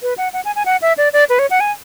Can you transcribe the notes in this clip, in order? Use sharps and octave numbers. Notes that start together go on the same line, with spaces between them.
B4
F#5
F#5
G#5
G#5
F#5
E5
D5
D5
B4
C#5
F#5
G#5